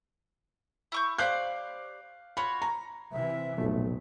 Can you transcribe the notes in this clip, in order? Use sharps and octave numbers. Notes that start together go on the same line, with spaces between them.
E4 C#6 G6
G4 C5 D5 F5 F#6 G6
F4 F#4 C#5 B5
A#5
C3 E3 E5
F1 B1 A#2 A3